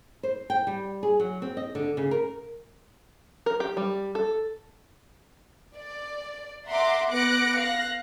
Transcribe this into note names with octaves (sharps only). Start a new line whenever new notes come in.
C5
G5
G3
G#4
F#3
C4
D#5
D3
C#3
A#4
A#4
G4
G3
A4
D5
E5 F#5 A#5 C6 D6
B3 D6 F#6 A#6 C#7 D7
F5 F#6 A#6